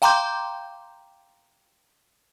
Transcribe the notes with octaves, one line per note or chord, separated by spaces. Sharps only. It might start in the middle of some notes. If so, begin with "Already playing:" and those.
F5 G5 A#5 C6 D6 G6